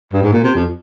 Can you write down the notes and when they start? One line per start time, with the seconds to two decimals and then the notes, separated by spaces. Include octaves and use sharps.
0.13 G2
0.23 G#2
0.33 A#2
0.44 C3
0.55 F2